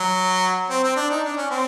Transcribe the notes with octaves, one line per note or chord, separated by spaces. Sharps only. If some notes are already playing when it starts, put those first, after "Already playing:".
Already playing: F#3
C4
C4
D4
D#4
D4
C#4
C4